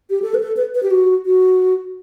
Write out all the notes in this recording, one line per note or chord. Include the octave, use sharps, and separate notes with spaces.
G4
A4
B4
A4
B4
B4
G4
F#4
F#4